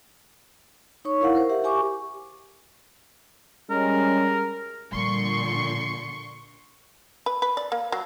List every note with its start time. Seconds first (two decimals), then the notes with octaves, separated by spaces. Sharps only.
1.05 D#4 C#5 C#6
1.21 E4 A#4 F5 F#5
1.35 A#4 C5
1.49 G4 E5 F#5
1.64 G4 G#5 C#6 D6
3.70 G3 G#3 C#4 A#4
4.92 A#2 D3 F3 G3 C6 C#6 C#7
7.26 B4
7.42 B4
7.57 D5
7.72 A#3
7.92 F#3